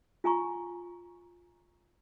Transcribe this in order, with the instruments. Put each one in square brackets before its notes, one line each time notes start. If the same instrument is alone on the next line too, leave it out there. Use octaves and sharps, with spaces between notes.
[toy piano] F4 G#5 A#5 C#6